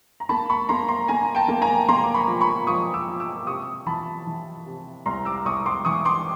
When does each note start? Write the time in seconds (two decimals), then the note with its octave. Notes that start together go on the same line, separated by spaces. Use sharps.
0.20 A#5
0.29 A#3 A5 B5
0.50 B5 C#6
0.69 A#3 A#5 C6
0.88 A#5 C6
1.08 A#3 G#5 A#5
1.35 G5 A5
1.48 A#3
1.62 G#5 A#5
1.88 A#3 A#5 C6
2.04 D6
2.14 B5 C#6
2.28 F3
2.41 B5 C#6
2.67 F3 C#6 D#6
2.94 D6 E6
3.07 F3
3.20 D6 E6
3.46 C3 C#6 D#6
3.86 E3 A5 B5
4.27 E3
4.66 C3
5.06 C2 A#5 C6
5.25 D6 E6
5.45 C2 C#6 D#6
5.66 C6 D6
5.85 E3 C#6 D#6
6.05 C6 D6